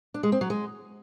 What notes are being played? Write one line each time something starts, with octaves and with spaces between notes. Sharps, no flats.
D4
G#3
C4
F#3
G#3